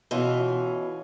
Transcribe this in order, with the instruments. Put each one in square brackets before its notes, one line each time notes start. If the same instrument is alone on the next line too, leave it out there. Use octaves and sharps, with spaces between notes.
[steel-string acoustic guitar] B2 E3 C#4 F4